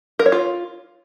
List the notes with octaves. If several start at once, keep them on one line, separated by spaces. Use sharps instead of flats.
A#4
C#5
F4